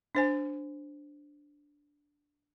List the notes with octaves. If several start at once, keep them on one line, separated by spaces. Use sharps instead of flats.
D4 C5 G#5